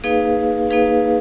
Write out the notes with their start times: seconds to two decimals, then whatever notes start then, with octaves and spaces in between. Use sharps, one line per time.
0.04 A#3 D#4 G#4 B4 F5
0.70 A#3 D#4 G#4 B4 F5